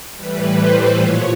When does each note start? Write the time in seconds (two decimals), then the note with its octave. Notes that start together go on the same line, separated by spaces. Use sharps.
0.16 A2 E3 G3 B4
0.55 C5
0.94 A#2 F3 C#5